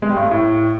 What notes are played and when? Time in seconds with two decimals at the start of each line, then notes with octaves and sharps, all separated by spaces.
0.02 G#3
0.09 G3
0.17 G2
0.24 A3
0.31 A2